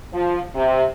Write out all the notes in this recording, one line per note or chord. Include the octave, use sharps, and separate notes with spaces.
F3
C3